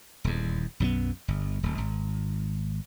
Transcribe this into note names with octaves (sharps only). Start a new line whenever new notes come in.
D#1 E2
B1 F#2 G3 B3
G1
D1
G#1